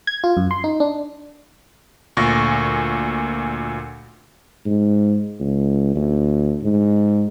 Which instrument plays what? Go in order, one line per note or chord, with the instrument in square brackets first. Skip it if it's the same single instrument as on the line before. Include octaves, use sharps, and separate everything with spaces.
[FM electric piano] G#6
F4
F#2
C6
D#4
D4
[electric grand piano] D2 A#2 C#6 A6 A#6
[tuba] G#2
C#2
D2
G#2